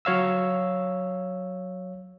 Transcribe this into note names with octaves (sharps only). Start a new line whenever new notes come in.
F#3 C#5 F5 E6